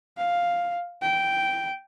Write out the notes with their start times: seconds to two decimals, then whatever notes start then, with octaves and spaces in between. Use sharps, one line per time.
0.17 F5
1.02 G5